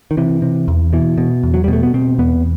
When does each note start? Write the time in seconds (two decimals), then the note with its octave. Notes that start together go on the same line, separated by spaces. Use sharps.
0.11 D#3
0.17 C3 E3
0.42 C3
0.68 E2
0.93 B2 E3
1.18 B2
1.43 E2
1.54 F#3
1.64 G3
1.68 B2 A3
1.83 B3
1.94 B2 C4
2.18 E2 B3